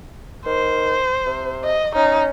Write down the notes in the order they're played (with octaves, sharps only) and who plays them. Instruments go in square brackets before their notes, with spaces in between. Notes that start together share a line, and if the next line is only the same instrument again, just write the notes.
[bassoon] D#3 [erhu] C5
[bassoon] C3
[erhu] D#5
[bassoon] C#4 [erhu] D#4